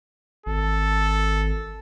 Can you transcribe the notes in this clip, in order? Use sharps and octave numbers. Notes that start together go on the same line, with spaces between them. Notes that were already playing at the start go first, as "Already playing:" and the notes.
G#1 A4